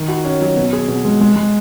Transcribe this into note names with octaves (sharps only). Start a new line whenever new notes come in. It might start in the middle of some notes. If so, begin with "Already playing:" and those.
Already playing: D#3
F#4
C#4
F#3
B2
G#4
B2
G#3
G#3
G#3